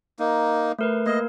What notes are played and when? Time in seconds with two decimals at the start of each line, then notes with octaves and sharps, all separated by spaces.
0.19 A#3 D#4
0.79 A3 A#4 B4
1.06 A#3 A#4 D#5